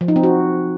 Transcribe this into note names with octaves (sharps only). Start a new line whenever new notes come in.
F3
D#4
C4
F#4